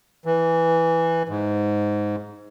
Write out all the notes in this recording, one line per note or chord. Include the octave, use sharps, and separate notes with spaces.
E3
G#2